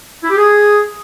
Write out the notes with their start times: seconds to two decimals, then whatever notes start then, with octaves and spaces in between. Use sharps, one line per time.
0.22 E4
0.29 G4
0.37 G#4